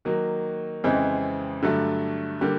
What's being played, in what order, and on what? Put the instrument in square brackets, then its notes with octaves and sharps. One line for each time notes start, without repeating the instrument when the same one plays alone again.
[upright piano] D#3 F#3 A#3
F2 C#3 E3 G#3 C4
G2 D3 F#3 A3
D3 G3 A#3